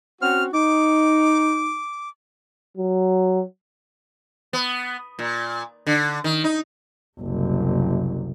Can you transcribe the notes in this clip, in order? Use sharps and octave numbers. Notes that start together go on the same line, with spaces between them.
C4 C#4 F#4 F6
D#4 D6
F#3
B3
A#2
D3
D#3
D#4
F#1 C2